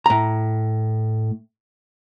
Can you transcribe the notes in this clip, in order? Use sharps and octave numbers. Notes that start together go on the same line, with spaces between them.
A2 A#5